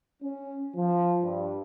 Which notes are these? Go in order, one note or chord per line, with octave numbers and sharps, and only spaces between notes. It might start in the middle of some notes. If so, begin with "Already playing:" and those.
C#4
F3
G2